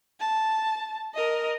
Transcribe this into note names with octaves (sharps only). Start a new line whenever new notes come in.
A5
A#4 D#5